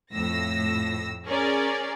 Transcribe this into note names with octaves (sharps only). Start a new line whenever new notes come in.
F2 A2 E6 A#6
C#4 G#4 A#4 D5